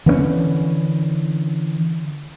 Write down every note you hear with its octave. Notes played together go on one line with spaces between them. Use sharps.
D3 E3 A#3 C#4